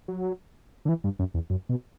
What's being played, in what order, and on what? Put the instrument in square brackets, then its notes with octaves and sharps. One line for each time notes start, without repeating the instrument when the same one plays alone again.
[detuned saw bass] F#3
D3
E3
G2
F#2
E2
F#2
B2